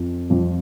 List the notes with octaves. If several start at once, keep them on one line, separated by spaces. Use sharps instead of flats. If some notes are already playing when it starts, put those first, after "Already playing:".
Already playing: F2 F3
F2 F3